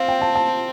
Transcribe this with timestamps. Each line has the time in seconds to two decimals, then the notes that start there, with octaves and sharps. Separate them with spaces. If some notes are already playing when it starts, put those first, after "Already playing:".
Already playing: C4 F5
0.08 G5
0.21 A5
0.35 A5